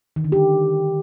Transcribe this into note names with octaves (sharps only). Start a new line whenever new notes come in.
D#3
D3
G4